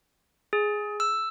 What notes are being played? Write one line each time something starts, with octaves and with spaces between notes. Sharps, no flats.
G#4
E6